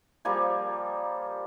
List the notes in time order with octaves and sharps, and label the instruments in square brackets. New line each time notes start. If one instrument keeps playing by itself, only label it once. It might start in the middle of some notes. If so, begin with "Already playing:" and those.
[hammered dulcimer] F3 G3 A#3 G#5